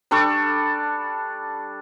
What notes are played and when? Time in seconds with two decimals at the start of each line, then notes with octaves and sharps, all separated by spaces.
0.11 G3 D4 A4 C#6